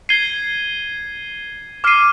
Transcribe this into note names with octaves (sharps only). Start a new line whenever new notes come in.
G#6 C7 D#7 G7
D6 F6 C7 D#7